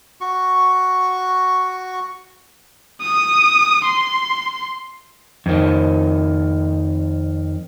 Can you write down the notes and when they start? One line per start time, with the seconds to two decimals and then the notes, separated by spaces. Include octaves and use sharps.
0.21 F#4 C#6
3.02 D#6
3.84 C6
5.46 F2 D#3